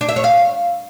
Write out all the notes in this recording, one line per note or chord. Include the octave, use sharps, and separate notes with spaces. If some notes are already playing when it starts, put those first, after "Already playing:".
D4
E5
C#5
F5